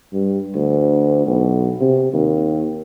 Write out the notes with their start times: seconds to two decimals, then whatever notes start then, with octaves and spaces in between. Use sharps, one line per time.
0.13 G2
0.55 D2
1.26 B1
1.80 C3
2.13 D#2